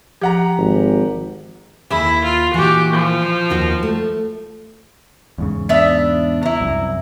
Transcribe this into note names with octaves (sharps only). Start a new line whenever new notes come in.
F3 G4 F#5 A#5
G#1
D#2 E4 G#4 E5
F4
A#2 E3 F#4 G4
F3
D#2 D#4 F#4
A3
E2 G#2 C#3
B3 D4 E5
E4 A#5
C2 F#2